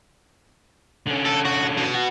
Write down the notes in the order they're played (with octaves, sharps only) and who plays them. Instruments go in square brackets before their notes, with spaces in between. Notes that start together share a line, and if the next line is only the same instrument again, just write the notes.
[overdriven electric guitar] D3 C#4
[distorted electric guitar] A4
F#4
B2
[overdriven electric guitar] F#4